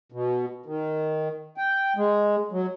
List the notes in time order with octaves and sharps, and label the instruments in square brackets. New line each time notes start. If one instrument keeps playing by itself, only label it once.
[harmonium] B2
D#3
G5
G#3
F#3